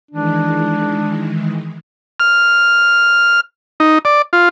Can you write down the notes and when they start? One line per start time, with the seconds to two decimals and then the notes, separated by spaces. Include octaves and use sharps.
0.11 D#3 E3 G#3 D4
2.20 F6
3.80 D#4
4.05 D5
4.33 F4